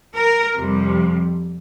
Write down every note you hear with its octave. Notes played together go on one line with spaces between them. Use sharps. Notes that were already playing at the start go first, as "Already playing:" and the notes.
A#4
F2 C3 G3